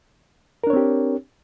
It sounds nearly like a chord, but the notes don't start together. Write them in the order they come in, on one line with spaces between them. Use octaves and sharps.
A#4 D4 C#5 C4 G4